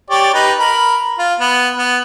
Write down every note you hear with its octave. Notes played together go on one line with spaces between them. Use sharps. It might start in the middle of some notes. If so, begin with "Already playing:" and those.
G4 C#5 D5
D#4 G4 B4
A#4 B5
F4
B3
B3